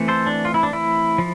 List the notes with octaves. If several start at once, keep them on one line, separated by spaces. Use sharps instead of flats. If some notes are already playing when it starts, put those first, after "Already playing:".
Already playing: E3 A3 C4
A4 C5
D4
F4
E4
D4
E4
F3